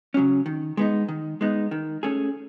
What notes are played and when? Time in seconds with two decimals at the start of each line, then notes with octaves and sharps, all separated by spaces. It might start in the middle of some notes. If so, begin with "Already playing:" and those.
0.14 C#3 F#3 C#4
0.46 D#3
0.77 G#3 B3 D#4
1.08 D#3
1.41 G#3 B3 D#4
1.71 D#3
2.03 A3 C#4 G#4